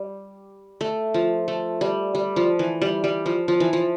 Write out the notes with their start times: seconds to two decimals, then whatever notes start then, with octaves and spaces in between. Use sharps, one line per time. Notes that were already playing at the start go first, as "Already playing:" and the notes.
Already playing: G3
0.81 A3
1.14 F3
1.48 A3
1.81 G3
2.15 G3
2.36 F3
2.59 E3
2.82 G3
3.04 G3
3.26 F3
3.48 F3
3.60 E3
3.73 F3